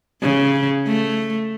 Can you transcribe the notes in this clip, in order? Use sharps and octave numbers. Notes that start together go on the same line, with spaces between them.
C#3
A3